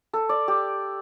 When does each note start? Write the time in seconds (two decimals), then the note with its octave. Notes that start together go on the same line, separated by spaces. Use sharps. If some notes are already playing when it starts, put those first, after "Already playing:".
0.13 A4
0.29 D5
0.48 G4